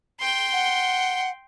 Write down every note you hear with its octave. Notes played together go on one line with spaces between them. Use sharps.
G5 C6
F#5